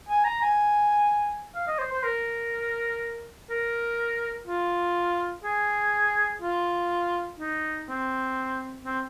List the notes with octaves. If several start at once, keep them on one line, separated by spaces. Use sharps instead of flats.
G#5
A#5
G#5
F5
D#5
C5
C5
A#4
A#4
F4
G#4
F4
D#4
C4
C4